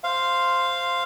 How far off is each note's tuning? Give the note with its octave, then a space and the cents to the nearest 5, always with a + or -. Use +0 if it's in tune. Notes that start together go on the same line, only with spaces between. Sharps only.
C5 +0 F5 -5 C6 +0